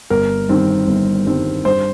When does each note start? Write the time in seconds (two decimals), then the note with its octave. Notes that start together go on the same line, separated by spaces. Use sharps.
0.10 G1 A#4
0.49 G2 D#3 C4
0.88 G1
1.27 G2 D#3 C4
1.65 G2 C5